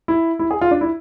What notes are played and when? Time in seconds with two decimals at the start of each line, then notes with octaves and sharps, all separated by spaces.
0.08 E4
0.39 E4
0.51 G#4
0.61 F4
0.71 D4
0.81 E4